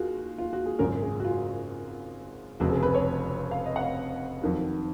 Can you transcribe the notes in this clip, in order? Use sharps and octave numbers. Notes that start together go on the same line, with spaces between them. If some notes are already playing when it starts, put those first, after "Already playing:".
Already playing: D#2 G#3 F4 F#4
F4
F#4
G#4
G#1 F#2 C#3 G#3 C#4 A#4
G#4
F#4
F4
F1 F2 C#3 F#4
G#4
B4
C#5
F5
D#5
F#5
F5
F2 D#3 F#3